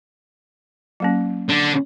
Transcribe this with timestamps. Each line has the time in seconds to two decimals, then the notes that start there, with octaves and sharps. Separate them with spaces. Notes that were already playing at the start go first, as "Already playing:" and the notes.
1.00 F#3 A#3 C#4
1.49 D3